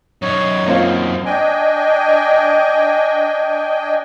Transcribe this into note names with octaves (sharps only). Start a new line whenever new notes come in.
F#2 D#4 C#5
A#3 C4 F4
D4 D#5 G5 G#5